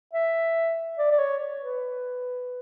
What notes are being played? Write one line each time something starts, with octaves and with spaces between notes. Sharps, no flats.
E5
D5
D5
C#5
B4